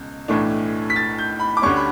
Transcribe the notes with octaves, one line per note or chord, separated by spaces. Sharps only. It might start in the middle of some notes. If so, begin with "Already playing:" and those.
Already playing: C#2 B2
B1 A2 E3 A3 D4
B6
A6
G6
B5
D6
D2 D3 G3 C#4 C#6
B5